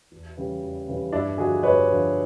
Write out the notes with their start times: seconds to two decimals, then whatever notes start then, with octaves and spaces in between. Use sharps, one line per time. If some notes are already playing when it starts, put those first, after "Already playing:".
0.11 E2
0.37 C#3 E3 G3
0.62 E2
0.88 C#3 E3 G3
1.12 G2 D4 E4
1.37 D3 F3 F#4 G#4
1.63 G2 B4 C#5
1.88 D3 F3